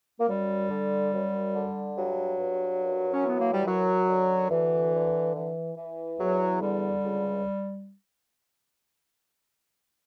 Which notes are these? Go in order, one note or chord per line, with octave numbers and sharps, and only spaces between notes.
A#3
F#2 G3
D3
F#2
D3
G2 F#3
G2
F#2
C#4
E3 B3
A#3
G3
F#2 F#3
D3
D2 E3
D3
E3
E3
E2 F#3
D3 G3
C#2